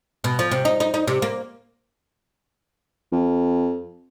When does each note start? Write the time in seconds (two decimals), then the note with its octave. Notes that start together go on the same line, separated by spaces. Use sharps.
0.24 B2
0.39 F3
0.51 C3
0.65 D#4
0.80 D#4
0.94 D#4
1.07 C3
1.22 A#3
3.12 F2